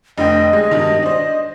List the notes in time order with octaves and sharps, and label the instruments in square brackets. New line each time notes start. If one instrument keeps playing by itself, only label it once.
[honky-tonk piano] F1 D3 G5 [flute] D#5
[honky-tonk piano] G#3 G#4
G2 B2 D#3
D4 C5